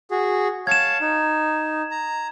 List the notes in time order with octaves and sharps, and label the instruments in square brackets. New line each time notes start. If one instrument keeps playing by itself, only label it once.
[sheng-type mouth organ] F#4 G#4
[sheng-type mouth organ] C#5 F5 A5 [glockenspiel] G#6 E7
[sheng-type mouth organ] D#4
A#5